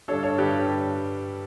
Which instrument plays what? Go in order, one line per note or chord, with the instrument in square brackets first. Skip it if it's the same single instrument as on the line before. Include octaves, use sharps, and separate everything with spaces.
[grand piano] G2 D3 G3 D4 A4 C#5
A4 C#5
G2 D3 G3 D4 G4 B4